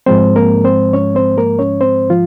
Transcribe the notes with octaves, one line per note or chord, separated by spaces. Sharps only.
G#2 F3 G#3 C4 C5
A#3 A#4
C4 C5
C#4 C#5
C4 C5
A#3 A#4
C#4 C#5
C4 C5
F3 F4